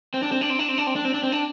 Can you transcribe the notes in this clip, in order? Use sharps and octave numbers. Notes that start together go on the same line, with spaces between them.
C4
D4
C4
D4
C4
D4
C4
D4
C4
D4
C4
D4
C4
D4